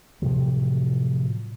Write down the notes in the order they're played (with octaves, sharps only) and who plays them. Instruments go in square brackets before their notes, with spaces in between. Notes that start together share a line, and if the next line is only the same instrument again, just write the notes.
[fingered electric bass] A2 C3 F3 F#3